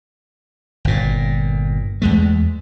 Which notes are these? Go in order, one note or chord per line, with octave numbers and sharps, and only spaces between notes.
G1 A#2
E2 G#3 A3